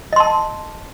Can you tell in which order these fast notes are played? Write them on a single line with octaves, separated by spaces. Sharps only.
D#5 C6 A5